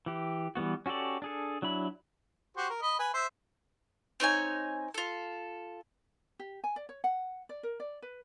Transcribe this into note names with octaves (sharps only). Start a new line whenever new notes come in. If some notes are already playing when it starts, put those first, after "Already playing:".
E3 G4
E3 G3 B3 F#4
C#4 F#4 G4 A4 D5
D4 G#4 A4
F#3 D4 E4 B5
F#4 G4 C5
A#4
D#5 B5
B4 G#5
C5 E5
C4 D#4 C#5 G#5
F4 A4
G4
G#5
D5
C#5
F#5
D5
A#4
D5
B4